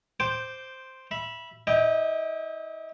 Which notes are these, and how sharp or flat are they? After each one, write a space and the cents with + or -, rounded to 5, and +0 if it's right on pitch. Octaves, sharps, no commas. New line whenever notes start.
C5 +0 G5 -10 D6 +0
E5 +15 B5 -15
E4 -40 D#5 -20 G5 +0